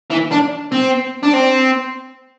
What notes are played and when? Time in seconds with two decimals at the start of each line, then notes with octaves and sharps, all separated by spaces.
0.10 E3
0.31 D4
0.72 C4
1.23 D4
1.34 C4